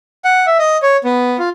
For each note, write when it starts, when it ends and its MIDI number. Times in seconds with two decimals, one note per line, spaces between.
0.24 0.46 78
0.47 0.57 76
0.59 0.78 75
0.83 0.97 73
1.04 1.37 59
1.39 1.49 65